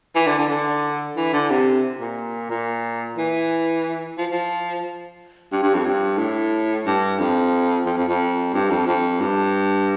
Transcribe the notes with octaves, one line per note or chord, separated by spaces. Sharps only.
E3
D3
D3
D3
E3
D3
C3
A#2
A#2
E3
F3
F3
G2
G2
F2
G2
A2
G2
F2
F2
F2
F2
G2
F2
F2
G2